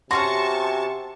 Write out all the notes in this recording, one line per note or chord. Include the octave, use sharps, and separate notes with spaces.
C3 C#4 F4 F#4 A5 C6 C#6